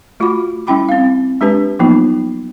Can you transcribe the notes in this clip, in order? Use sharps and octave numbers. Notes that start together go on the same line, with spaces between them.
A3 F4 F#4 F#5 B5 D6
G3 C#4 E4 G5 B5 D6
C4 F5
G#3 D4 G4 B4 A5
F3 F#3 A#3 B3 D#4 F4